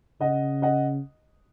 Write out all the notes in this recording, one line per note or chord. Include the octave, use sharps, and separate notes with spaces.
C#3 D#5 F#5
D#5 F#5